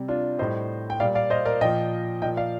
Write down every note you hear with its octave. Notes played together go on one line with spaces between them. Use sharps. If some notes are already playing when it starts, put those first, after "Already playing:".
Already playing: C3 G3
D4 F4
A2 G3 C5 D#5
G5
A#2 G3 D5 F5
D5 F5
C5 D#5
A#4 D5
A#2 F3 D#5 G5
A#2 F3 D#5 G5
D5 F5